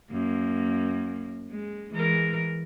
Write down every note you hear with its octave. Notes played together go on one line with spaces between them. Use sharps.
F#2 A#3
G#3
E3 G#3 A#4